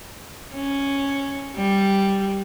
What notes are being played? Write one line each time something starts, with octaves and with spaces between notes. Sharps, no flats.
C#4
G3